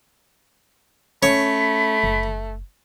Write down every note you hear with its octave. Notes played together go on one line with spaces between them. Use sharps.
A3 C#4 C#5 B5
F#1